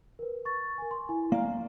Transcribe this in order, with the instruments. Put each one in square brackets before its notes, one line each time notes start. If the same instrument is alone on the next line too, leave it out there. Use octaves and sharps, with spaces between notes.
[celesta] A#4 B4
C#6 A6
A#4 G#5
C6
E4 G#5
[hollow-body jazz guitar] A#3 F5 [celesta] D5